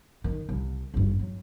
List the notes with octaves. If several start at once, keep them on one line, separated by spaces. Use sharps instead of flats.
D#3
C2
G#1 G2
F#3